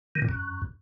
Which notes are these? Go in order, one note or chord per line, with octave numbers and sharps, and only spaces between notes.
D#3
A#2
F#2